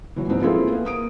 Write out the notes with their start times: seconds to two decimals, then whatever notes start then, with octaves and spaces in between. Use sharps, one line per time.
0.16 E3 F#3
0.28 G#2 F3 B3 C4 D#4
0.42 A#3 C4 E4 F4 G#4 A4
0.72 B3
0.85 A#3 D#6 D7